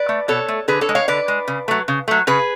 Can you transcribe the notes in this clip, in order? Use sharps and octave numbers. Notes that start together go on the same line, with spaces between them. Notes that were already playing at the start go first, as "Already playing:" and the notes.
Already playing: B4 D5
A3
B2 A4 C#5
A3
D3 G#4 B4
A4 C#5
G#3
C#5 F5
D3 B4 D5
G#3
C#3
F#3 A3
C#3
F#3 A3
C#3 G#4 B4